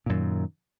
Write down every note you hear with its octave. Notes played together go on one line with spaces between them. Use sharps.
F#2 A#2 D#3